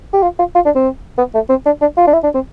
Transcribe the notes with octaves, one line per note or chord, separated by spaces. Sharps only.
G4
F4
F4
F4
D4
C4
B3
A3
C4
D4
D4
F4
D4
E4
D4
C4